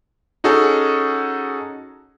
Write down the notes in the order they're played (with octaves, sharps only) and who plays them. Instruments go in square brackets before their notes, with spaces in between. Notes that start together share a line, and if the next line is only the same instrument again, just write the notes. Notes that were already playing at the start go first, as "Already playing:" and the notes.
[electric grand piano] C#4 D#4 F#4 G#4 A4